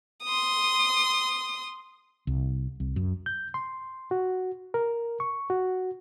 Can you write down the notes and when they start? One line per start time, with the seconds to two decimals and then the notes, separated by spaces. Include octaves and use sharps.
0.24 C6 D#6
2.27 C2
2.80 C2
2.96 F#2
3.26 G6
3.54 C6
4.11 F#4
4.74 A#4
5.20 C#6
5.50 F#4